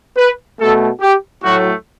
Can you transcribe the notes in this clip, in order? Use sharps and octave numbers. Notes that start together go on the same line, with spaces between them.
B4
B2 A3 A4
G4
A2 F#3 A3 F#4